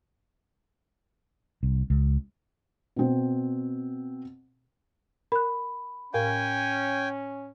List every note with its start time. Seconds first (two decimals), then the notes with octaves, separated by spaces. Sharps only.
1.63 C2
1.90 C#2
2.96 B2 C4
5.32 A#4 B5 F#6
6.14 A2 C#4 A#4 F5 G5 G#5